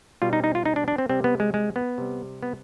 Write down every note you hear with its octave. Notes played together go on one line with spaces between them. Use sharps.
B2 G3 F4
D#4
D#4
F4
D#4
D4
D4
C4
C3 G3 C4
B3
G#3
G#3
B3
C3 G3
B3